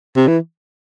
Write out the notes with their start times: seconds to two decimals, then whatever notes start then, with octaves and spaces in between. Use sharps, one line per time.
0.16 C3
0.27 E3